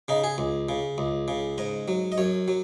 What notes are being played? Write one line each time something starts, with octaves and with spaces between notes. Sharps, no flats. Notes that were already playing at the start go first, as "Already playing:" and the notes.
C#3 D#4
G#4
C#2
C#3
C#2
C#3
G#2 D#5
F#3
D#5
F#2 C#5
F#3